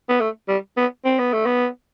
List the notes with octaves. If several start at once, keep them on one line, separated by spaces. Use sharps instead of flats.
B3
A3
G3
B3
C4
B3
A3
B3